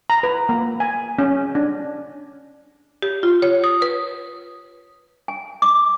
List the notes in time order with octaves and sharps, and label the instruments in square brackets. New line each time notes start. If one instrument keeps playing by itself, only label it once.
[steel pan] A#5
B4
A#3
G#5
C#4
D4
[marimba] G4
F4
C#5
D#6
B4
[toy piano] G#5
D6